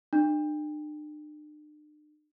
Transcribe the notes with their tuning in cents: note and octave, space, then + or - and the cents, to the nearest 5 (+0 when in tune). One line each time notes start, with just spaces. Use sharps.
D4 +45